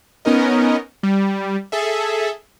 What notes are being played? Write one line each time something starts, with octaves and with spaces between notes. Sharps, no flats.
B3 C#4 D#4 A#4 D#5
G3
G#4 A4 E5